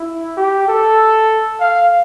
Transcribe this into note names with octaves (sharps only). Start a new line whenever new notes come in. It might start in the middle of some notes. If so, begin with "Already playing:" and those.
Already playing: E4
G4
A4
F5